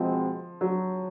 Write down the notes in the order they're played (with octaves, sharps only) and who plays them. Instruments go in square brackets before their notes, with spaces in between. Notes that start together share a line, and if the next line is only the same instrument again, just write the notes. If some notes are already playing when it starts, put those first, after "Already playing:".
Already playing: [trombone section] B2 G#3 C4 [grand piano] F3
[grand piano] F#3